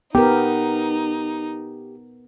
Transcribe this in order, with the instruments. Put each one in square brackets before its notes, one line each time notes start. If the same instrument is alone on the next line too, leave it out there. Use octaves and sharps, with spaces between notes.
[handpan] B3 A#4 [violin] D#4 [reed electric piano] G4